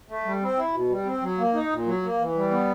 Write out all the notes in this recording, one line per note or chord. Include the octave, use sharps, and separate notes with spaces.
A3
G3
C4
E4
B2
G3
C4
F#3
A#3
D#4
A#2
F#3
A#3
E3
G3
B3